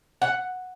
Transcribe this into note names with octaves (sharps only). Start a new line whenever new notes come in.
F#5